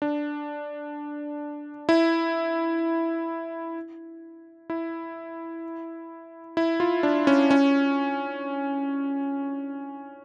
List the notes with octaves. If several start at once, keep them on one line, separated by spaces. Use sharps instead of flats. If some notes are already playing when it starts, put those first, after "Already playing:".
D4
E4
E4
E4
F4
D4
C#4
C#4